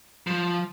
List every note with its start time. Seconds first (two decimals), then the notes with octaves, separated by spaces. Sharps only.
0.27 F3